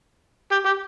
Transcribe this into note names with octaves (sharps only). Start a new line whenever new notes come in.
G4
G4